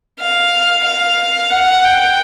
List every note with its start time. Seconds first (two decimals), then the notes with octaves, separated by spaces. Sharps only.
0.19 F5
0.84 F5
1.50 F#5
1.84 G5